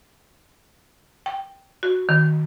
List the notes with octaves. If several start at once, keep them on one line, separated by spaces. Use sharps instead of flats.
G5
F#4
D#3